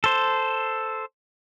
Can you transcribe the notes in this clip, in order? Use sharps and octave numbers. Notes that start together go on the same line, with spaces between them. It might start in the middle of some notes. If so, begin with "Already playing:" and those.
A4 C5